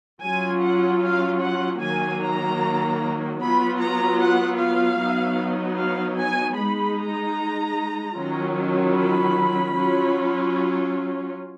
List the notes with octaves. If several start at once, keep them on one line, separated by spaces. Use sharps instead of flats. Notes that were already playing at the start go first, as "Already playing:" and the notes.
F#3 C#4 F4 G#5
F#5
F5
F#5
D#3 F#3 A#3 G#5
A#5
F#3 B3 F4 B5
A#5
F#5
F5
F#3 B3 D#4
F5
G#5
G#3 D#4 B5
A#5
D#3 F#3 C#4 F4
B5
F#3 C#4 F4